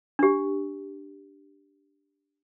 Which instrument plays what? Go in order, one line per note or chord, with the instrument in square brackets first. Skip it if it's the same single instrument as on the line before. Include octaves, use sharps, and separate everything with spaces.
[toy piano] D4 G4